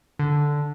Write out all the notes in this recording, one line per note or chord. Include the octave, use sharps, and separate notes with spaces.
D3